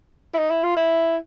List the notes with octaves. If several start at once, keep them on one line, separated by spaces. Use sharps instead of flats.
E4
D#4
E4
F4
E4